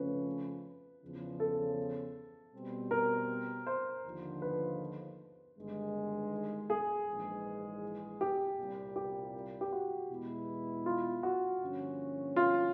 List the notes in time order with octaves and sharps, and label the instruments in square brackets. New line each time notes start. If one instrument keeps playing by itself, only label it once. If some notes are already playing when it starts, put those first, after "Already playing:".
Already playing: [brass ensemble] F2 C#3 F3 A3 C#4 [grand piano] B4
[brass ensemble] E2 C#3 F3
[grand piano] A4
[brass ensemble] B2 G3 C4
[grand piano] A#4
C5
[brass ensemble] D#2 D3 F3
[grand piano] B4
[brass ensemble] G1 G2 D#3 G#3
[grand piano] G#4
[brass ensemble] A#1 G#2 E3 G#3
[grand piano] G4
[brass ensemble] C2 A#2 G3
[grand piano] G4
G4
F#4
[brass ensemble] E2 B2 G#3 B3 E4
[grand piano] F4
F#4
[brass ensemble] G2 D3 F3 A#3 C#4
[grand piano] F4